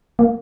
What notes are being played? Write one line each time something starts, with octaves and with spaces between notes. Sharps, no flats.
A#3